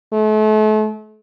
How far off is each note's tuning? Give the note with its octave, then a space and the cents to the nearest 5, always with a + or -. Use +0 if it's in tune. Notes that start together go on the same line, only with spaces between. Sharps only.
A3 -40